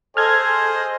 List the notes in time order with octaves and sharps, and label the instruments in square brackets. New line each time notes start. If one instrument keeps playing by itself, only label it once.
[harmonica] G#4 D#5 [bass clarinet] A4 [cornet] C5 [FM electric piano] F6 G#6